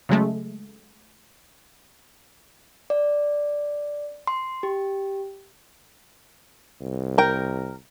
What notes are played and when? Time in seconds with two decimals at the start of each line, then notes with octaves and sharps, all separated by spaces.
0.09 C#3 F#3 G#3 A3
2.90 D5
4.27 C6
4.63 G4
6.81 C2
7.18 A#4 G5